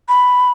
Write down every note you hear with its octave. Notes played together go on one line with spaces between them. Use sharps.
B5